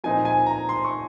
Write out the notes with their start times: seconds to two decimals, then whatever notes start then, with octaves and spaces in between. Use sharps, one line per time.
0.04 A#2 F3 C4 D#4 G#5
0.25 G#5
0.46 A#5
0.69 C6
0.85 C#6